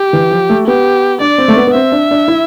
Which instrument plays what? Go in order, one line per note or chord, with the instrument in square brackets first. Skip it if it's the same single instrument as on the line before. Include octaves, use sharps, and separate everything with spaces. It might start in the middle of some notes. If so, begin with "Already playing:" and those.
Already playing: [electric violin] G4
[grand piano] E3
F3
A3
[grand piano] B3 [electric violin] G4
[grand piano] D4 [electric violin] D5
[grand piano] C4
A3
B3
B3
[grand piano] C4 [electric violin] E5
[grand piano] D4
D4
E4